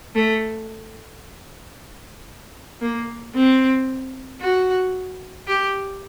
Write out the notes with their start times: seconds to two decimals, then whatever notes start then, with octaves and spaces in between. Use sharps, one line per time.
0.15 A3
2.81 A#3
3.34 C4
4.41 F#4
5.48 G4